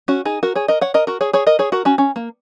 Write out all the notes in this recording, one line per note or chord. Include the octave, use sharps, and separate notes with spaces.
C#4 F#4
D#4 G#4
F#4 A#4
G#4 C#5
A#4 D#5
C#5 F#5
A#4 D#5
F#4 A#4
G#4 C#5
G#4 C#5
A#4 D#5
G#4 C#5
F#4 A#4
C#4 F#4
C#4
A#3